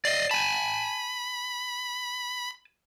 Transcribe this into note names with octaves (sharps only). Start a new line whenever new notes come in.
D5 D#5 C7
G#5 A5 B5